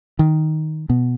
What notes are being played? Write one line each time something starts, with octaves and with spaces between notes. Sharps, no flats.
D#3
B2